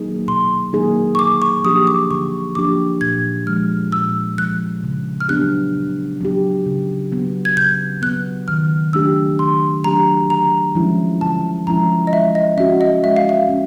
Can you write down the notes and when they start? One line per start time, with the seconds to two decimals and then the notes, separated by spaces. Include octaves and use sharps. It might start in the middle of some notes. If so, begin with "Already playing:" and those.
Already playing: F#3 A#3 D#4 G#4
0.28 B2 C6
0.73 F#3 A#3 D#4 G#4
1.15 C#6
1.19 D3 D6
1.42 C#6
1.64 F3 A#3 D4 G4 D#6
1.87 D6
2.11 D3 C#6
2.55 F3 A#3 D4 G4 D6
3.01 A#2 G#6
3.47 F3 G#3 F6
3.92 A#2 E6
4.38 F3 G#3 F#6
4.84 C#3
5.20 F6
5.28 F#3 B3 D4 G4 F#6
5.75 C#3
6.21 F#3 B3 D4 G4
6.66 C#3
7.12 F#3 B3
7.45 G#6
7.57 C#3 G6
8.02 F#3 B3 F#6
8.48 D#3 F6
8.93 F#3 A3 D4 G4 E6
9.39 D#3 C6
9.84 F#3 A3 D4 G4 A#5
10.30 D3 A#5
10.75 F3 G#3 C#4 E4
11.21 D3 A5
11.67 F3 G#3 C#4 E4 A#5
12.07 D#5
12.13 G#3 E5
12.35 D#5
12.57 C#4 F#4 E5
12.81 D#5
13.04 G#3 E5
13.16 F5
13.29 E5
13.49 C#4